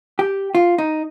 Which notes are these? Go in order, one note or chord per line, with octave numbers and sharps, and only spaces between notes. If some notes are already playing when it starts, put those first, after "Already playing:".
G4
F4
D#4